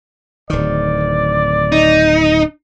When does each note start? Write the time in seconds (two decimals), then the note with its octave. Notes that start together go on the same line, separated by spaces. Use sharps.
0.50 D1 D#3 D5
1.72 D#4